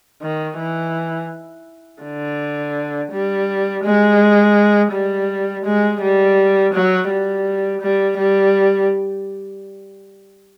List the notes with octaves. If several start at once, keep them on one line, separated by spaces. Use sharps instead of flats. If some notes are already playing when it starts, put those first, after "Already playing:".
D#3
E3
D3
G3
G#3
G3
G#3
G3
F#3
G3
G3
G3